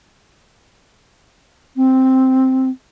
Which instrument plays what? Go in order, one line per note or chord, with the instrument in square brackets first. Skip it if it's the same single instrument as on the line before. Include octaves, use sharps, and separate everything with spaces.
[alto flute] C4